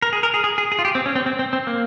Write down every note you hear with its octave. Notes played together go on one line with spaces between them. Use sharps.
A#4
G#4
A#4
G#4
G#4
G#4
G#4
F4
G4
C4
C#4
C4
C4
C4
C4
A#3